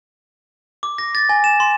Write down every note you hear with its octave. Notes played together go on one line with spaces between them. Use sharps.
D6
A#6
A6
G#5
E7
C6